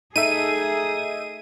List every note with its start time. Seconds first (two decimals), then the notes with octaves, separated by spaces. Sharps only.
0.16 A3 D#4 G#4 E5 D#7